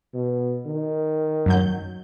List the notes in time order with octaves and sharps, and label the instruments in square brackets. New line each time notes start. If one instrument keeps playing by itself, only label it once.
[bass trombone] B2
D#3
[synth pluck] F#2 F#3 G6